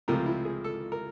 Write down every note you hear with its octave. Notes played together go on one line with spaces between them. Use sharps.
C#2 C3 F3 A3 C4 A#4
E4
G#4
A4
A#4